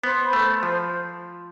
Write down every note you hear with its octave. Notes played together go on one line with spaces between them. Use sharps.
B3 C5
B5
A3
C5
F3 C5